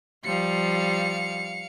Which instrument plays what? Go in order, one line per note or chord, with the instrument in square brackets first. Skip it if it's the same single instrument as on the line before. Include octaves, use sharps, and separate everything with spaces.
[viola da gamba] F3 G3 [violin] F5 C#7